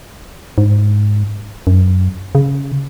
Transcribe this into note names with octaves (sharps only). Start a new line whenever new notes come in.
G#2
F#2
C#3